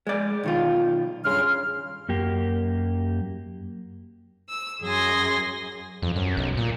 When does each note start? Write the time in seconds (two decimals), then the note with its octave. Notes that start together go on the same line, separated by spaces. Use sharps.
0.07 G#3 D5
0.43 B1 D#3 F4
1.25 G2 C#3 C6 F6
2.09 F#2 A#3 G4
4.48 E6
4.82 F#2 G#4 G#5 C6 A#6
6.02 F2
6.16 F#2
6.37 B1
6.57 A#2